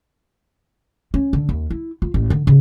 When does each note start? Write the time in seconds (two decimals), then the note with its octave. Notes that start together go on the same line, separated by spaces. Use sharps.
1.14 C#4
1.33 D3
1.49 D#2
1.70 E4
2.02 F4
2.14 A1
2.30 D3
2.47 C#3